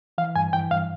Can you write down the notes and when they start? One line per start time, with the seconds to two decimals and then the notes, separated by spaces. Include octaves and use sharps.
0.18 E3 F5
0.36 G2 G#5
0.53 E3 G5
0.71 G2 F5